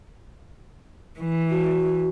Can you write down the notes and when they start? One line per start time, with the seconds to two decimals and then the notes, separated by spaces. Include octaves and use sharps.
1.19 E3
1.49 F#4